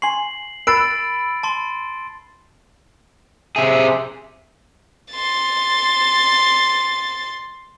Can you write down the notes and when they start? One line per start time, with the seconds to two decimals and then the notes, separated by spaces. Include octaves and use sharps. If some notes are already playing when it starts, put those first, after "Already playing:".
0.02 G#5 C6 C#6 C7 F#7
0.67 A#4 B5 E6 F#6 A6 C7 D7
1.43 A5 C6
3.56 C3 G#4 E5
5.13 C6 A6